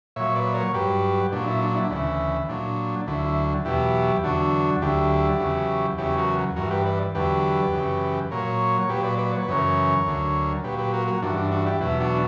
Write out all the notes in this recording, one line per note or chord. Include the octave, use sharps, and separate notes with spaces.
A#2 F#3 C#5 E5
B4 D5
A#4 C#5
G2 F#3 G4 B4
A#2 F#3 D4
E4
D4
E4
D4
D2 C#3 E3 E4
A#2 F#3 D4
D2 D3 F#3 E4
E4
E2 B2 F#3 E4 G4
E2 D3 F#3 D4 F#4
D2 D3 F#3 E4 G4
E2 C#3 F#3
E2 C#3 F#3 E4 G4
F#4 A#4
G2 E3 F#4 A#4
G4 B4
B4 D5
E2 D3 F#3 G4 B4
F#2 C#3 E3
A#2 F#3 A#4 C#5
C#5
A#2 F#3 G4 B4
B4 D5
B4 D5
C#5
B4
F#2 C#3 E3 A#4 C#5
D2 D3 F#3
A#2 F#3 G4 B4
G4 B4
F#4 A#4
F#4 A#4
G2 E3 D4 F#4
D4
D4 F#4
E4 G4
E2 B2 F#3 E4
D4 F#4